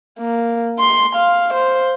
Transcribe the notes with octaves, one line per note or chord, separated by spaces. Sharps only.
A#3
C6
F5
C5